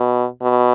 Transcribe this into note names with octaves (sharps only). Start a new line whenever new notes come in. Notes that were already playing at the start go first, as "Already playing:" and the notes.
Already playing: B2
B2